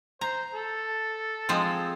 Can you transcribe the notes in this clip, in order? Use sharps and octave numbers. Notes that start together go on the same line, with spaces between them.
C5 A#5
A4
F3 G#3 C4